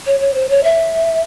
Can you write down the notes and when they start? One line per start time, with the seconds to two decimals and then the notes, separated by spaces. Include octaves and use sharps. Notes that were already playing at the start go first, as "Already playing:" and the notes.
0.06 C#5
0.20 C#5
0.34 C5
0.49 C#5
0.64 E5